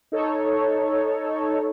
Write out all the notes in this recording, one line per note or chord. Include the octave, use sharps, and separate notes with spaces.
D#4 A4 C#5